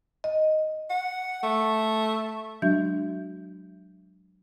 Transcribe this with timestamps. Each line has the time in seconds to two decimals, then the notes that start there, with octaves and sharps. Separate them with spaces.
0.24 D#5
0.90 F#5
1.43 A3
2.62 F#3 G#3 D4 F#4 E5 G6